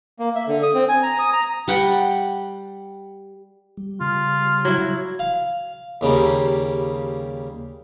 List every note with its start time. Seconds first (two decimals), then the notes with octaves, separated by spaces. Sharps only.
0.19 A#3
0.35 E5
0.47 D3
0.63 D#6
0.74 C4
0.89 G#5
1.03 A#5
1.19 D#6
1.33 A#5
1.68 G3 F#5 G5
3.77 G3
4.01 C#3 G3 F4
4.65 F#3 E4
5.19 F5
6.01 D#2 C#3 G3 A#3